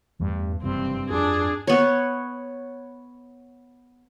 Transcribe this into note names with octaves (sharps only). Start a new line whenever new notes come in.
E2 G2 E3 A3
F#1 G2 C3 E3 C4
F2 F3 D4 G#4
B3 C#5